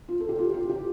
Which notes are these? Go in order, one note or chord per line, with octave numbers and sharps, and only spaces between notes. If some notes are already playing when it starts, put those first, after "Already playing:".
F4
A4
G4
F4
G4
F4
G4